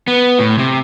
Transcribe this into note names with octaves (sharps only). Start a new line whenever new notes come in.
B3
A2
C3